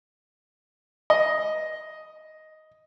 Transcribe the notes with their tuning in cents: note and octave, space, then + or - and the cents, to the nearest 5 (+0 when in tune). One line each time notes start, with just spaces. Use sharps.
D#5 +5